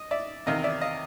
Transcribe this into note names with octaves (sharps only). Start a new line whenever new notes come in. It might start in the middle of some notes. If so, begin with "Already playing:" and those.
Already playing: D#5
D5 E5
E2 C3 D#3 D#5 F5
D5 E5
D#5 F5